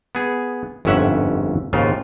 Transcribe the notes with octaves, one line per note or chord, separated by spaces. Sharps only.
B3 G#4
G1 F2 G#2 C#4 E5 F#5
D#2 G#2 C#3 F4